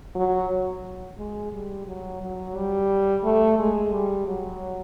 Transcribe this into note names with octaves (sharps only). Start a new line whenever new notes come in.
F#3
G#3
G3
F#3
F#3
G3
A3
G#3
G3
F#3